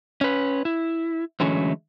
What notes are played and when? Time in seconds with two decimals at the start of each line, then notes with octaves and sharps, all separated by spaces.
0.21 C#4 B4
0.65 E4
1.40 D3 E3 F#3 G#3 A3 C#4